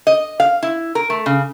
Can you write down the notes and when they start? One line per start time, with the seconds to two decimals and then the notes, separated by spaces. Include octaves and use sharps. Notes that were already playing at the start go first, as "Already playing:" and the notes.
0.07 D#5
0.40 F5
0.63 E4
0.95 A#4
1.10 A3
1.26 C#3